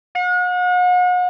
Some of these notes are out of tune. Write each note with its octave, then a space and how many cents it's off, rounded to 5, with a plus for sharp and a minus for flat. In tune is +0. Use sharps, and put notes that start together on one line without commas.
F#5 -40